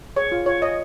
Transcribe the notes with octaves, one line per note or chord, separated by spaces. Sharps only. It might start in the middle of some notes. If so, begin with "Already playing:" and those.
G#4 C#5
F4
F4 C#5
C#5 D#5